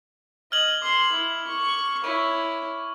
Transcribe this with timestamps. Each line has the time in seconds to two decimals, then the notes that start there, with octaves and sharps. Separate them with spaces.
0.52 D#5 F6 G#6 F#7
0.82 C6 D6
1.12 E4
1.47 C#6
2.04 E4 C#5 C#6